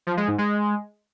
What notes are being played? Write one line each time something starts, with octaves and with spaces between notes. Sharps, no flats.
F3
G#3
G#2
G#3